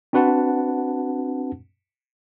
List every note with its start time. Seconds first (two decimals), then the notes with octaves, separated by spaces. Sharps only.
0.13 C4 D4 F#4 B4 F#5 A5